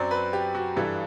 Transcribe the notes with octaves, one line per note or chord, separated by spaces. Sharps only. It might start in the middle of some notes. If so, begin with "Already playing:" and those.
Already playing: F#2 F#3 C4 D5
B4
G4
F#4
G2 E3 G3 A4